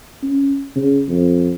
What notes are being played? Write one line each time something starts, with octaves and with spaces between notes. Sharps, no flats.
C#4
C#3
F2